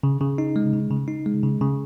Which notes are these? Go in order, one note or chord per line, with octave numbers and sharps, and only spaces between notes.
C#3
C#3
D#4
G#3
C#3
C#3
D#4
G#3
C#3
C#3